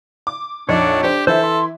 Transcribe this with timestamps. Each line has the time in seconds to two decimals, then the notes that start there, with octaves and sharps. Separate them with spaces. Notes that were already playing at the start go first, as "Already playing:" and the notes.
0.27 D6
0.69 A#1 F2 D4 D#4 C#5 F#5 D6
1.03 D4 G4 C5
1.27 E3 E4 A4 C5
1.44 C6